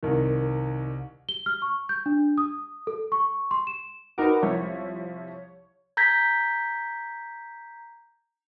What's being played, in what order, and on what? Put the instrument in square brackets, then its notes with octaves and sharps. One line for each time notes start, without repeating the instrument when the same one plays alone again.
[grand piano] C2 D#3
[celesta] G7
F6
C#6
G6
D4
D#6
A4
C#6
C6
E7
[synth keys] D#4 A#4 D6 [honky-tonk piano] F#4 B4
[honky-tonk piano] C2 F3 E4 [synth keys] C#5
[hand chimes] A#5 G6 G#6 A#6 B6